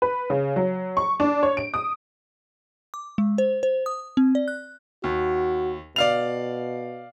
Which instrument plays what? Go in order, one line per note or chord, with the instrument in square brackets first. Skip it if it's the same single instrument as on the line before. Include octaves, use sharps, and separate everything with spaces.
[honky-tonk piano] B4
C#3
F#3
C#6
D4
C#5
D7
D#6
[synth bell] D6
G#3
C5
C5
D#6
C4
D5
F#6
[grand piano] D#2 [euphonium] F#4
[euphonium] B2 [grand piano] D5 F5 F7